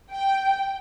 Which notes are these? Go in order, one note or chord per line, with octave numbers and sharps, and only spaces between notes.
G5